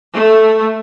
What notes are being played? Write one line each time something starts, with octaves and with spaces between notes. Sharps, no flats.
A3